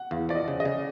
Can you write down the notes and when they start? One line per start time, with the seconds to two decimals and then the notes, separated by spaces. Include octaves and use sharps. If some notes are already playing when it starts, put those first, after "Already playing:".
Already playing: F#5
0.11 E2 F5
0.29 F3 D5
0.35 D#5
0.48 C#3
0.60 D#5
0.65 C#3